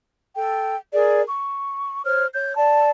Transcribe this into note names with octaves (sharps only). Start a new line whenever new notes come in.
A4 G5
G#4 A#4 D5
C#6
C5 C#5 F6
C#5 G6
D5 A5